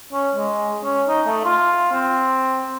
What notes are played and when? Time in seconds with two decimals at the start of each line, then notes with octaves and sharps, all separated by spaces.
0.13 C#4
0.35 G#3
0.84 C#4
1.08 D#4
1.27 A3
1.45 F4
1.93 C4